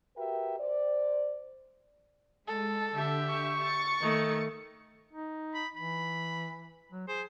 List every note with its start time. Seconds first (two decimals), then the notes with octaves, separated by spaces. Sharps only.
0.17 F#4 G4 A#4 B4 E5 G5
0.60 C5 D5
2.48 G#3 A4
2.95 D3 G4 E5
3.30 C#6
3.62 A6 C#7
4.01 D#3 A3
5.13 D#4
5.54 B5
5.76 E3 B5
6.92 F#3
7.08 G#4 C5